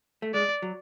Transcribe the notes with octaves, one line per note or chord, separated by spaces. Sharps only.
A3
G#3 D5
F#3